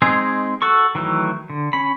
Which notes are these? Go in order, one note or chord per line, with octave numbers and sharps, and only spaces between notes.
G#3 C4 D#4 G#4
F#4 A4 C#6
D#3 E3 F#3 A3
D3
C#4 B5